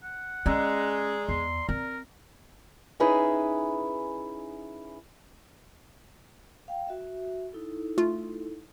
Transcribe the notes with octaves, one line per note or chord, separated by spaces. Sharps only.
F#5
G#3 C#4 D5 A#5 E6
E2 C6
C4 A#4
C#4 D#4 E4 G#4 B4
F5 G5
F#4 E5
D#4 E4 A4
A3 F4